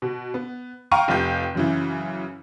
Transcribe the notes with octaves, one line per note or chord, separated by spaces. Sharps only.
B2
B3
F5 G5 A#5 C#6 F6 D#7
F1 F4 G4 G6
F#2 C#3 E3